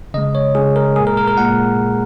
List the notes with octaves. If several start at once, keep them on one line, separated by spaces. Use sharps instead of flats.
C#3 G#3 D#5
C#5
C#3 G#3 G#4
A#4
A#2 G#3 G#4
A#4
A#4
A#4
A#2 G#3 F#5